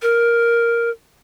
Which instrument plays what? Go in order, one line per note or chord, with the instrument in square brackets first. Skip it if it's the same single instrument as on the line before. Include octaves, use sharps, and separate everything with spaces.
[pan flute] A#4